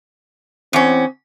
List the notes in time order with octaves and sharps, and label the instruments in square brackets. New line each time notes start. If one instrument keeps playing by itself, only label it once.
[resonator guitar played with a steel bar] E2 C#4 [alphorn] C4